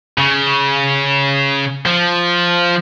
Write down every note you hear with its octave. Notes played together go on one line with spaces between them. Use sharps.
C#3
F3